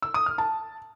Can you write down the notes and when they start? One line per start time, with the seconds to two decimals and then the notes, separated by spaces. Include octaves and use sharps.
0.02 E6
0.14 D#6
0.26 F6
0.38 A5